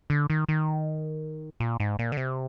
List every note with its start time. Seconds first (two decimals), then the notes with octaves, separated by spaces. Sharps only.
0.10 D3
0.30 D#3
0.49 D#3
1.60 A#2
1.80 G#2
1.99 A#2
2.12 D3
2.17 C3